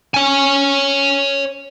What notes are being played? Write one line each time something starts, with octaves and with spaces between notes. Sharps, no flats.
C#5 G#5